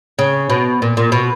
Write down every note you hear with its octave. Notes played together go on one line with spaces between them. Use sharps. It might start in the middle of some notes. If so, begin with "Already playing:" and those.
C#3
B2
A#2
A#2
B2